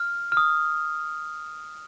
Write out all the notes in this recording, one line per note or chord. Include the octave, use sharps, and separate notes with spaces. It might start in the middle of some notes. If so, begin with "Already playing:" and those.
Already playing: F6
F6
D#6